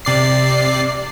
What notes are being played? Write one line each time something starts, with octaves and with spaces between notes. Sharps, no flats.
C3 D5 C7